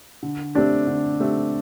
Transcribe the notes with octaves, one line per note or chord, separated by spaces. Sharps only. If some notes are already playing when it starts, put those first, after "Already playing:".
D3
A3 C4 D4 G4
D3
A3 C4 G4